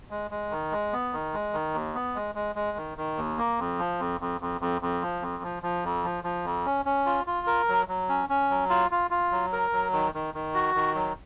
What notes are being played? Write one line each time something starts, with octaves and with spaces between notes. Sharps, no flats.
G#3
G#3
D#3
G#3
B3
D#3
G#3
D#3
D#2
B3
G#3
G#3
G#3
D#3
D#3
D#2
A#3
F2
F3
F2
F2
F2
F2
F2
F3
F2
F3
F3
F2
F3
F3
F2
C#4
C#4
F4
F4
A#4
F#3
F#3
C#4
C#4
F#3
F4
F4
F4
F#3
A#4
F#3
D#3
D#3
D#3
F#4
D#3
F#3